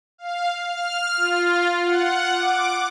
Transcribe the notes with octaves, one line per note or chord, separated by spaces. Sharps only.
F5
F6
F4
F#5
D6